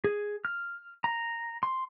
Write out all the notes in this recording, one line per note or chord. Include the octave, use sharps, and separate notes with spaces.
G#4
F6
A#5
C6